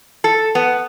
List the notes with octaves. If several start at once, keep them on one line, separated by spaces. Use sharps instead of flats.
A4
B3